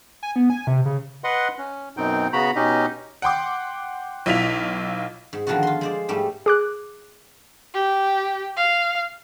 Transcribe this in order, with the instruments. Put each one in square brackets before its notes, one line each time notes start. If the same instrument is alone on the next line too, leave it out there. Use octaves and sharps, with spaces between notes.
[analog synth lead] G#5
B3
G#5
C3
C#3
[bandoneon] B4 D#5 F#5 C6
C#4
F#2 B2 C4 D#4 G5
C#3 B3 F#4 A#5 B5
B2 C#4 D#4 G4 D#5
[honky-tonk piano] F#5 G5 C6 D6
B1 E4 F4 B6 F7
[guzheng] G#2
D3 D#3 F3 B3 F4 F#4
F4 C6
G#3 C5 D5
G#2 G3 A3
[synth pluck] G#4 D6 F#6
[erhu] G4
F5